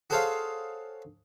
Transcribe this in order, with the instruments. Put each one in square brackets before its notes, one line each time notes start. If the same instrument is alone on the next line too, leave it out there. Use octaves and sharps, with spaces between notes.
[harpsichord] F#4 G#4 A4 C5 C#5 F5